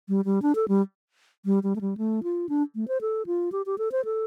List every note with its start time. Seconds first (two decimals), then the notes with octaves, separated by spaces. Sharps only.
0.09 G3
0.25 G3
0.42 D4
0.55 A4
0.68 G3
1.45 G3
1.63 G3
1.76 A3
1.81 G3
1.97 A3
2.23 F4
2.49 D4
2.75 A3
2.88 C5
3.01 A4
3.26 F4
3.52 G4
3.66 G4
3.78 A4
3.92 C5
4.05 A4